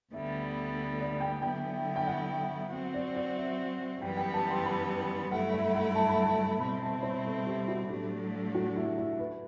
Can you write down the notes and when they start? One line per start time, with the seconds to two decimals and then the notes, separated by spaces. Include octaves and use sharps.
0.13 D2 D3 G3 B3 E5
0.99 D5
1.20 G5
1.42 D3 F#3 B3 E4 G5
1.96 G5
2.07 F#5
2.72 F#3 C4 F#4
2.94 D5
3.15 D5
3.37 E5
4.01 F#2 E3 G3 B3 G5
4.17 G5
4.34 A5
4.50 C6
4.66 B5
5.31 G2 F#3 A3 E4 F#5
5.53 E5
5.75 F#5
5.95 A5
6.09 B5
6.22 A5
6.60 B2 G3 C4 E4 B5
6.82 A5
7.03 C5
7.25 A4
7.46 G4
7.68 F#4
7.90 A2 F#3 A3 D4 G4
8.55 F#4
8.76 E4
8.98 E4
9.19 B4